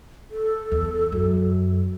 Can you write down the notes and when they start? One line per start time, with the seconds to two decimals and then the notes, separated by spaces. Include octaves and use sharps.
0.31 A4
0.71 E2
1.12 F#2